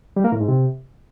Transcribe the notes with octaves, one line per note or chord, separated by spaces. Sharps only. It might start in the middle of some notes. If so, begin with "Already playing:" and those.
G3
A#3
A2
G#2
C3